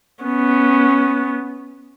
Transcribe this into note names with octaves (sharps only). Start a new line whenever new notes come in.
B3 C#4